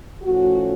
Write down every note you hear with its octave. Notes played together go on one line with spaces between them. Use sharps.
A2 F3 A3 C#4 F#4